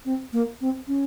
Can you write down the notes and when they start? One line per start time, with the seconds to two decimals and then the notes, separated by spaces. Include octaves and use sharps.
0.05 C4
0.33 A#3
0.61 C4
0.88 C#4